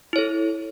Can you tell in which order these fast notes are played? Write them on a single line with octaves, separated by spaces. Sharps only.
E4 C#5 A4